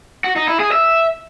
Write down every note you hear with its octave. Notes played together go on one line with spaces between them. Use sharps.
F#4
D#4
E4
G#4
E5